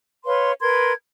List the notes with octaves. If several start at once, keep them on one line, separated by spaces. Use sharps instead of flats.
B4 C#5 F5 C6
A#4 B4 C6 G#6